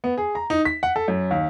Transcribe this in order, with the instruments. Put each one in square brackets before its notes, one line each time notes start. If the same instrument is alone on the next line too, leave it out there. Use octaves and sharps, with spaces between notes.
[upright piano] B3
G#4
A#5
D#4
B6
F#5
A4
F#2
D#2